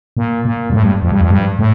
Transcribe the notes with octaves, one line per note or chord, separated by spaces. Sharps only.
A#2
A#2
G2
A2
G2
F2
G2
F2
G2
A2